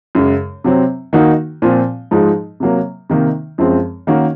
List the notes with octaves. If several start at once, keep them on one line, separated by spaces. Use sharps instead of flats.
F#2 C#3 G#3
C3 F#3 C4
D#3 A#3 D#4 F#4
A#2 F3 C4
G#2 F3 G#3 D#4
C3 F#3 A#3
C3 D#3 A#3 D#4
F#2 F3 G#3 C4
D#3 A#3 C#4 F#4